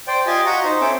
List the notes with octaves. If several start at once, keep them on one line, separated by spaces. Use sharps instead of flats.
C5 D5 G5
F4 G4 D#5 G#5 A5
F#4 D#5 A#5 C#6 D#6
D#4 C5
C4 C#4 A4 E5 G5 D6